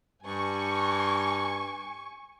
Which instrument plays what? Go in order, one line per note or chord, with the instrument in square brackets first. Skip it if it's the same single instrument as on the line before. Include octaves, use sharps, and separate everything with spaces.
[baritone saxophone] G2 [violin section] G#5 C#6